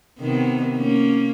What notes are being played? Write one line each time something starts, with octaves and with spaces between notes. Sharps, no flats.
C3 D#3 B3
A#3 C#4